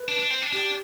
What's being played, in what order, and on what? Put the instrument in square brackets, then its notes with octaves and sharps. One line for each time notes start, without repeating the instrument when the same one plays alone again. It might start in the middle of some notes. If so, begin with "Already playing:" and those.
Already playing: [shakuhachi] B4
[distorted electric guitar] D4
D4
C4
D4
[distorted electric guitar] D4 [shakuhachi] G4